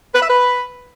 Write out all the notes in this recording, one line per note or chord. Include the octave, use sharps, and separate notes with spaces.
B4
E5
B4